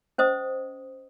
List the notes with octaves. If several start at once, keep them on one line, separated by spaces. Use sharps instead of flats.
C#4 C5 D#5 D#6